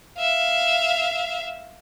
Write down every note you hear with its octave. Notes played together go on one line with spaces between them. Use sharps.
E5 F5